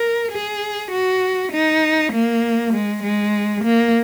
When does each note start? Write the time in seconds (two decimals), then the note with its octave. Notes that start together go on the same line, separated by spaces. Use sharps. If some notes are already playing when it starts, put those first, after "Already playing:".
Already playing: A#4
0.32 G#4
0.91 F#4
1.52 D#4
2.13 A#3
2.74 G#3
3.03 G#3
3.64 A#3